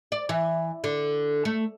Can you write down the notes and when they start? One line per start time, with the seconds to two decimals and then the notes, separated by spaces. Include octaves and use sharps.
0.12 D5
0.29 E3
0.84 D3
1.45 A3